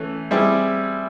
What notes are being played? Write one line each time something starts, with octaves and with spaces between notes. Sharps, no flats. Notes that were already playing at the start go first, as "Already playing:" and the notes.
Already playing: E3 A3 C#4
G3 C4 E4 G#4